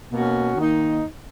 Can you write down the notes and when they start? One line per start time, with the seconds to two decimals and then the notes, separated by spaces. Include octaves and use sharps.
0.11 B2 A#3 C#4 F#4
0.56 D#3 A#3 D#4